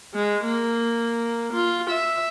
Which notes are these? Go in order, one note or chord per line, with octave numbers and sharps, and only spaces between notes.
G#3
A#3
F4
E5